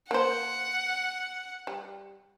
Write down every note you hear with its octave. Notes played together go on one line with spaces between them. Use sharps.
A#3 C5 F#5
G3